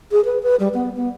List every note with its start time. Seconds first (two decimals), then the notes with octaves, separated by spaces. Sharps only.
0.12 G#4
0.25 B4
0.43 B4
0.60 G3
0.74 B3
0.96 B3